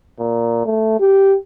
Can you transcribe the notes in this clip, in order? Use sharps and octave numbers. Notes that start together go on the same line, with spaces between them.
A#2
A3
G4